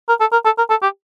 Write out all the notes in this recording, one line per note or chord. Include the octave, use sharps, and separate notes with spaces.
A#4
A4
A#4
A4
A#4
A4
G4